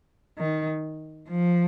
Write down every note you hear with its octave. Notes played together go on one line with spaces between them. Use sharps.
D#3
F3